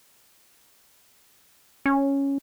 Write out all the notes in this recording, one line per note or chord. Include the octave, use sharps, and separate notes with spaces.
C#4